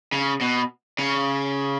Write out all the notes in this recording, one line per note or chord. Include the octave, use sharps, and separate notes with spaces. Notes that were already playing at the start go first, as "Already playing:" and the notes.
C#3
B2
C#3